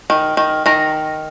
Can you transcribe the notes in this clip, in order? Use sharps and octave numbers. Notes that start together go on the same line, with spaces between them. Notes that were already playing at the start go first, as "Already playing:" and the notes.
D#3
D#3
D#3 A#5